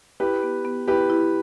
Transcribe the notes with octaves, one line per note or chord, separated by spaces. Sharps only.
E4 G4 B4
B3
B3
E4 G4 B4
E4